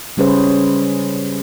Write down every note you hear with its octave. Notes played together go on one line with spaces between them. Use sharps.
C#3 G3 C#4 G#4 B4 C5